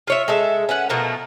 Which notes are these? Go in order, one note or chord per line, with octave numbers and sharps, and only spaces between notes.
F4 C#5 E5
G#3 A4 E5
C#4 B4 F#5
B2 F3 A3 A#4